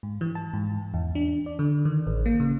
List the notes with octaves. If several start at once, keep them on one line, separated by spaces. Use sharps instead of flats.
G#2
E3
A5
G#2
E2
D4
D5
D3
D#3
A1
A#3
C#3